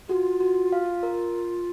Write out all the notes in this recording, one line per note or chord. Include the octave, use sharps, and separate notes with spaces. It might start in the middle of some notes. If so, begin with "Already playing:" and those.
F4 F#4 G#4
F#4
F5
A#4